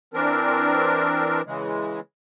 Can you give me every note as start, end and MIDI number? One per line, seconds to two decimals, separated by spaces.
0.14 1.41 52
0.14 1.41 60
0.14 1.41 62
0.14 1.41 70
1.46 2.00 49
1.46 2.00 52
1.46 2.00 56